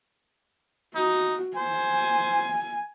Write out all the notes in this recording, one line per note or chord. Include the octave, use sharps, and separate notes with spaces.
D#4 F#4
C5 G#5